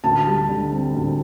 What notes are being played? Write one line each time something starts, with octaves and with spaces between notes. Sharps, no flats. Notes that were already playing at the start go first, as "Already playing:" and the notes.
D2 A5
G3
D3
C4
D2